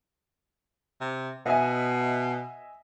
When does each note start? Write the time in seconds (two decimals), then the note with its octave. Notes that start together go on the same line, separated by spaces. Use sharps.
1.01 C3
1.46 B2 D#5 E5 G#5